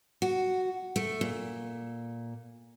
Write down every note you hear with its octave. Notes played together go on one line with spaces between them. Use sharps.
F#4
A3
A#2